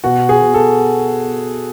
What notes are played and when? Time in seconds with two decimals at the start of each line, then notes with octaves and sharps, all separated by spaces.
0.04 B2 F#4
0.29 G#4
0.42 B2
0.54 A4